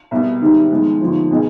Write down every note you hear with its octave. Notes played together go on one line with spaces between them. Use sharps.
C2 B2 B3
G#2 D#3 G3 C4
F2 D#3 G#3 B3
D#2 D3 F3 B3
B2 B3 D#4 G#4